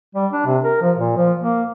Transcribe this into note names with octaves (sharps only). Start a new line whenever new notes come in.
G3
D4
C3
A#4
F3
A#2
F3
A#3